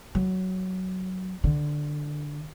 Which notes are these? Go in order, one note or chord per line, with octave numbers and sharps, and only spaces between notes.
F#3
D3